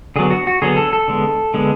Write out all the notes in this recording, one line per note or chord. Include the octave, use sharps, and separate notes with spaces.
D3 F#3 B3 G#4
F#4
F#4
D3 F#3 B3 G#4
A4
A4
D3 G#3 B3
D3 G#3 B3